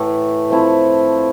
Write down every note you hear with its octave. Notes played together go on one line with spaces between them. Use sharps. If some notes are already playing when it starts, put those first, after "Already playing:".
Already playing: A2 E3 A3
F3 A3 C4 E4